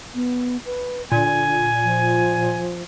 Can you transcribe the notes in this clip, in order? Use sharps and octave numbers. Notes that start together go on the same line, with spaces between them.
B3
B4
A#2 D3 G#5
F3